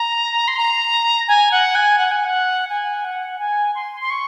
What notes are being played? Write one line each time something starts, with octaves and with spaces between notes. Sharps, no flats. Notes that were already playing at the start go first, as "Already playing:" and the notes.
Already playing: A#5
C6
A#5
G#5
F#5
G#5
F#5
G#5
F#5
G#5
F#5
G#5
C6
C6
C#6